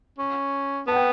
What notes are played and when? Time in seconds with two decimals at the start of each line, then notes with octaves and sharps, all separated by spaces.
0.18 C#4
0.87 B3 A5
0.92 F#5
0.96 G5